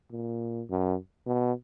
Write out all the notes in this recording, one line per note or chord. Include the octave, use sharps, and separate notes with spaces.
A#2
F#2
B2